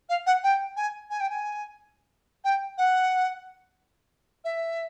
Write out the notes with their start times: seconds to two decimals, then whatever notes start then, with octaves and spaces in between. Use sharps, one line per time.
0.09 F5
0.27 F#5
0.44 G5
0.77 G#5
1.10 G#5
1.20 G5
1.30 G#5
2.44 G5
2.78 F#5
4.45 E5